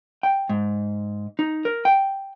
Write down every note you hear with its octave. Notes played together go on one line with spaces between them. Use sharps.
G5
G#2
D#4
A#4
G5